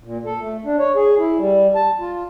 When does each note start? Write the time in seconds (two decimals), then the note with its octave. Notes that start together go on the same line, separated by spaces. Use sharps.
0.04 A#2
0.26 A4
0.41 A3
0.65 D4
0.79 C#5
0.96 G#4
1.18 E4
1.39 G3
1.75 A5
2.00 F4